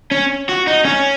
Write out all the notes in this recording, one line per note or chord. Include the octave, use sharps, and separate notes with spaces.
C#4
F#4
D#4
C#4